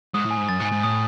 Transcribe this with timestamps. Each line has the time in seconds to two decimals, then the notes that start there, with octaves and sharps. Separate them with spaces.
0.14 G#2 D#6
0.25 A2
0.31 G#5
0.37 G#2
0.49 F#2 A6
0.60 G#2
0.65 G#5
0.72 G#2
0.83 A2 D#6